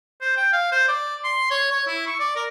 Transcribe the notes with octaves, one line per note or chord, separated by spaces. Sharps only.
C5
G5
F5
C5
D5
C6
C#5
C#5
E4
C#6
D5
A#4